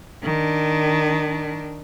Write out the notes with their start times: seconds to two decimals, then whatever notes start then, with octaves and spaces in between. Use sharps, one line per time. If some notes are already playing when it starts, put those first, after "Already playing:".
0.24 D#3 D4